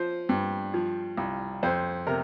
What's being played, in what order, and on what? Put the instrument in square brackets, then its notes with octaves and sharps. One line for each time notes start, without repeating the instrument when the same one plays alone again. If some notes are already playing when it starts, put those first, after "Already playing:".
Already playing: [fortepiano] F3 C5
G2
F3
C2
F2 C5
C3 A#4